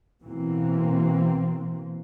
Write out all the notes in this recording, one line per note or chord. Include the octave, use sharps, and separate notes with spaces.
B2 E3 A#3 C4